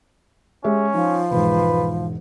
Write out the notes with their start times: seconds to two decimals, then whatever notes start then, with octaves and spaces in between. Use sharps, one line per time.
0.64 G#3 C#4 G4 E5
0.94 F3 D#4 F4
1.31 E1 G#2 B4